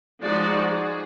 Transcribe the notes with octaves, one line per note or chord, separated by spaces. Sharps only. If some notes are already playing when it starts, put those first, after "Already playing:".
F3 G#3 D#4 F#4 D5
G#4